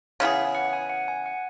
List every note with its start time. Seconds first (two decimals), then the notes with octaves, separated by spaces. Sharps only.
0.20 C#3 E3 B3 G#4
0.55 F#5
0.73 G#5
0.90 F#5
1.08 G#5
1.26 F#5